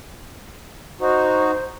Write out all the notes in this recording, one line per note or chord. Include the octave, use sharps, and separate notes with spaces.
D#4 F#4 C5